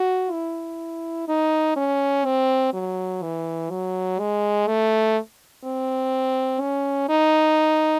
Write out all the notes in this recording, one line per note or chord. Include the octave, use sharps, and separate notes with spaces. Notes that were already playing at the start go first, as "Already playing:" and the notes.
Already playing: F#4
E4
D#4
C#4
C4
F#3
E3
F#3
G#3
A3
C4
C#4
D#4